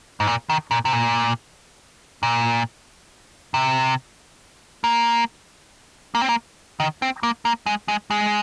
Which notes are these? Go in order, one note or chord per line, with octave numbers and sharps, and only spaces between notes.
G#2
A#2
D#3
A#2
C3
A#2
A#2
C3
A#3
A#3
C4
A#3
D#3
C4
A#3
A#3
G#3
G#3
G#3